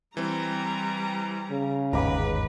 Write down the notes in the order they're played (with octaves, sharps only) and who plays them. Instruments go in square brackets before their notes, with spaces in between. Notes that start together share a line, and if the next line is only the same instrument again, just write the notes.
[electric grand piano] E3 C4 [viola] G3 A#5
[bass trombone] C#3
[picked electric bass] G1 D#2 G#2 [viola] B4 [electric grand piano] A#5 B5 D6